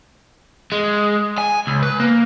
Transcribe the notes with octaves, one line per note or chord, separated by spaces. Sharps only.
G#3
G#5
C#2
B4
A#3